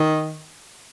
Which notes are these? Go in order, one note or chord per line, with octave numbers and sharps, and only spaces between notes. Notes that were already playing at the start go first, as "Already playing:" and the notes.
Already playing: D#3